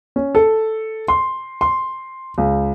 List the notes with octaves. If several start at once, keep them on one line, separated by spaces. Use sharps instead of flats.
C#4
A4
C6
C6
C#2